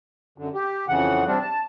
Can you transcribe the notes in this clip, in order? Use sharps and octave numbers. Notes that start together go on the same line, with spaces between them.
F#2 D3
G4
F2 C#3 E3 F#5
C3 G3 C4 D4
A5